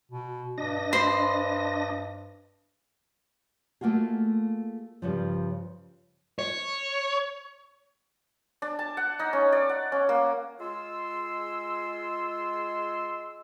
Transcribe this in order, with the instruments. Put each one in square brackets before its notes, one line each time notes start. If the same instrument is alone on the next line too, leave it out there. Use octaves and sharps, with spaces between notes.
[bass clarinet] B2
[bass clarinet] G2 [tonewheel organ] D4 D#5 A#6
[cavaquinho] C5 B5
[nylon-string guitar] A3 A#3 F4 F#4 G#4
G2 C#3 F3
[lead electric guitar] C#5
[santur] D4
A5
F#5
D#4
C#4
D5
F#5
C#4
A#3
[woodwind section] G#3 F4 C6 E6